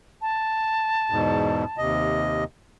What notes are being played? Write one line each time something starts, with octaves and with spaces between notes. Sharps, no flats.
A5
E2 G#2 B2
D#2 C3 D#5